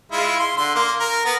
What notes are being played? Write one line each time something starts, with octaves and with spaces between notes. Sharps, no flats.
G#3 E4 F4
C6
D3 C6
A#3 C6
A#4
B3 A#4